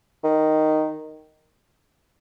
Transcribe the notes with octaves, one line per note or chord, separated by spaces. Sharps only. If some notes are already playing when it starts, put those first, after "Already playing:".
D#3